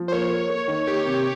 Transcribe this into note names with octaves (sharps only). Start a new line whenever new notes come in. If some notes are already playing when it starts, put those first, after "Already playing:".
Already playing: F3
C5
A#3 C#5
A#3
A#3
D#3
A#3 G4
C3